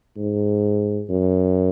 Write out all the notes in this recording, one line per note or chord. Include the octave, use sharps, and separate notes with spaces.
G#2
F#2